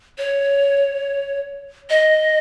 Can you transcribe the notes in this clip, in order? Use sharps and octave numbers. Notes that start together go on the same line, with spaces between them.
C#5
D#5